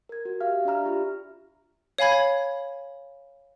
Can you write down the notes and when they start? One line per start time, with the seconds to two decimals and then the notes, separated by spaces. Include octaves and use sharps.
0.09 A#4 G#6
0.25 F#4
0.41 G4 E5 F5 F6
0.65 D4 D5 E5 A#5 F6
0.85 F4 G4
1.98 C#5 F5 G#5 B5 G#6